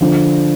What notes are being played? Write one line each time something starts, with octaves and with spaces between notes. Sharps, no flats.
D3 F3